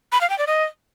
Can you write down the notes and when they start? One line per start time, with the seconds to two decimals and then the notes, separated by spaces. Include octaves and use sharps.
0.12 B5
0.21 F5
0.30 G5
0.38 D5
0.47 D#5